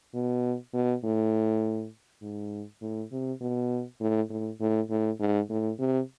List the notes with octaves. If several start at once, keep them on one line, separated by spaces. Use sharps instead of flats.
B2
B2
A2
G#2
A2
C3
B2
A2
A2
A2
A2
G#2
A2
C3